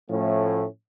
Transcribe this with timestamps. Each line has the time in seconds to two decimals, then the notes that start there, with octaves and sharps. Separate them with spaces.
0.10 A2 F3 A3 C#4 E4